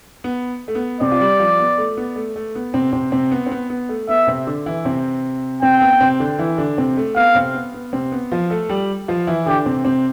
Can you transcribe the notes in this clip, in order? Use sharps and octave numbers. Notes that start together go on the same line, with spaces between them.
B3
A3
B3
C3 C4 D5
F4
G3 G4
F3 F4
B3
A3
B3
A3
A3
B3
C3 C4
C3 C4
C3 C4
B3
C4
B3
B3
A3
B3 E5
C3 C4
D3 D4
E3 E4
C3 C4
C3 C4 G5
B3
B3
C3 C4
D3 D4
E3 E4
D3 D4
C3 C4
A3
B3 F5
C3 C4
B3
B3
C3 C4
B3
F3 F4
A3 A4
G3 G4
F3 F4
E3 E4
D3 D4 G4
C3 C4
C3 C4